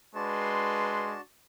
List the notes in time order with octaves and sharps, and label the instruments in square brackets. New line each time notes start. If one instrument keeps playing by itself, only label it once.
[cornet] G#3 [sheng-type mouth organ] D4 F#4 A5 [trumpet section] B4 C6